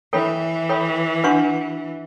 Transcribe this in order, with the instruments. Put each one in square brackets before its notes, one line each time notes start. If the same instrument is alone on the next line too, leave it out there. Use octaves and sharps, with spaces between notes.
[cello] E3 [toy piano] A4 C#5 G5 B5
[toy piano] A4 C#5 G5 B5
D4 F#4 B4 F#5 C#6